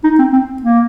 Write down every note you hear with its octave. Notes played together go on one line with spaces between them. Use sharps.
D#4
C4
C4
A#3